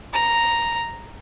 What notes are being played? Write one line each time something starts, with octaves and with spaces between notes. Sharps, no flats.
A#5